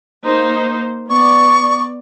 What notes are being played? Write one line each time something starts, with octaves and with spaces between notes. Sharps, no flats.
A#3 D#4 C5
B3 D5 C#6